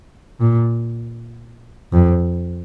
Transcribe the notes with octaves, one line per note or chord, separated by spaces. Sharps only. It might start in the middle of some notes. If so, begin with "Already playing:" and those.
A#2
F2